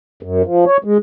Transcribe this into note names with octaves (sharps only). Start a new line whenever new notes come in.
F#2
F3
C#5
G#3